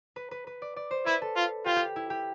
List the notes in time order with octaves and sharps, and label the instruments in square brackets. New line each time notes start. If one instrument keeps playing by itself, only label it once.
[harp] B4
B4
B4
D5
D5
C5
[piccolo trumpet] E4 [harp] B4
[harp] A4
[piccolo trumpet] F4
[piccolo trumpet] F4 [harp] G4
[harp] G4
E4
G4